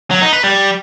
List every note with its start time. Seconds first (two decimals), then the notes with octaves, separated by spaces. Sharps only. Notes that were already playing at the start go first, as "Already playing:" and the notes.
0.11 F#3
0.22 D#4
0.33 B4
0.44 G3